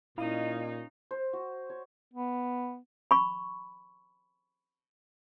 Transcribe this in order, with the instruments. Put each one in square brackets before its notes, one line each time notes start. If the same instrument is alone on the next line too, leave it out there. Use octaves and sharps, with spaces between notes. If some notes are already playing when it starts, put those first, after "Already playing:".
[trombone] A#2 [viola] C#4 D#4 [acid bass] E4 [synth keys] D#5 F5
[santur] C5
F#4
C#5
[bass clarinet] B3
[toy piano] B5 C#6